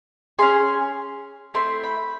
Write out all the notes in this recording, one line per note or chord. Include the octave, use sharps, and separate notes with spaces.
C#4 E4 G#4 C6
A3 C4 E4 C6
B5